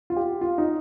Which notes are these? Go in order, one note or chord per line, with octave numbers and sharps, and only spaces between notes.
F4
G4
F4
D#4